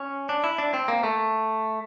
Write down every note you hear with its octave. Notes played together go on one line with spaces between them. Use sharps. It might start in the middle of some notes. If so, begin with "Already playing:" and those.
Already playing: C#4
D4
E4
D4
C4
A#3
A3